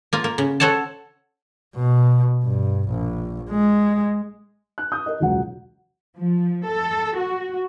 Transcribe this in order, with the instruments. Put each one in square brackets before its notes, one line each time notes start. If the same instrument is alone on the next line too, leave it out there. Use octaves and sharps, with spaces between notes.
[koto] A#3 F4
A#3
C#3
A4 C5 C#5 F#5 A5
[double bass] B2
G2
A#1
G#3
[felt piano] F#6
D#6 G6
A#4 D#5
E1 C#2 F#3 F#5
[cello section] F3
A4
F#4